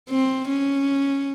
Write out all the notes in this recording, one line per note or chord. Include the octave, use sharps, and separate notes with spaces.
C4
C#4